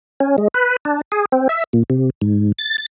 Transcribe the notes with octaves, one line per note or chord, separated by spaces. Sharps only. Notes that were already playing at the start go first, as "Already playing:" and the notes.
C#4
G#3
B4
D4
G#4
C4
E5
A#2
C3
G#2
A6
A6